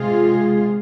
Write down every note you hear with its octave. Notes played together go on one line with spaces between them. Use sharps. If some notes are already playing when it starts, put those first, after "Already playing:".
Already playing: C3 G#3 F4 G#4